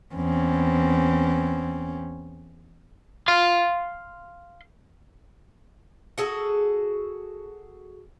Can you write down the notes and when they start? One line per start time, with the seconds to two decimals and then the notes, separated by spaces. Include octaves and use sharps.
0.13 E2 C4 C#4
3.28 F5 C6
6.18 F#4 G#4 A4